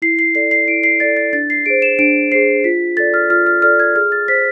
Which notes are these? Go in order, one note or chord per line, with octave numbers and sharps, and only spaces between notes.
E4 C7
C7
A4 D5 C7
C7
E4 D7
C7
A4 D5 A6
A6
D4 A6
C7
G#4 C5 D7
E7
D4 D7
G#4 C5 C7
F4 B6
A4 D5 A6
F6
F4 F6
F6
A4 D5 F6
G#6
G#4 F6
A6
C5 B6